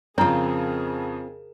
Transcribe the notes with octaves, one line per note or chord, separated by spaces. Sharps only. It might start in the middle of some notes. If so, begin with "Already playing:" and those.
F2 C#3 C4 F4 G#4 A#4 C#5 A#5